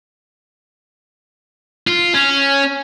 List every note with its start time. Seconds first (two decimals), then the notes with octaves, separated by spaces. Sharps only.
1.87 F4
2.14 C#4